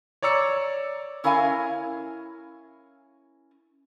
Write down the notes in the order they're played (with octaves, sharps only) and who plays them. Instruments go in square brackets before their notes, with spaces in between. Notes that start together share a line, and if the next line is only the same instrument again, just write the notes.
[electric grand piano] C#5 D5 A#5 E6 C#7
[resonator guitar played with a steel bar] C#4 E4 A#4 F5 G#5